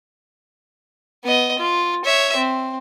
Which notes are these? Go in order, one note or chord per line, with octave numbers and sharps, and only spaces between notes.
B3 D#5
F4
C#5 E5
C4